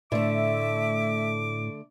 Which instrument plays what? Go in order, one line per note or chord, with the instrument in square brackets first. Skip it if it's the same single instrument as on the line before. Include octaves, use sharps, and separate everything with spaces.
[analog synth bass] A2 [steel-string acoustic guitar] D3 A3 [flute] E5 [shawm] D6